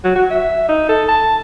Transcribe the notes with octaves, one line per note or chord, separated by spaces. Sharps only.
F#3
F#4
E5
D#4
A4
A5